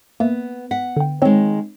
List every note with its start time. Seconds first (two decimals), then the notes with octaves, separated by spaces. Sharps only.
0.20 A#3 B3 E5
0.71 F#5 B6
0.96 D3 G5
1.22 D#3 G#3 C4 C#5